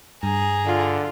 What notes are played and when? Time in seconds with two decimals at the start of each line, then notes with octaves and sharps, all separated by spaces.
0.23 G2 G#4 A#5
0.65 D3 F4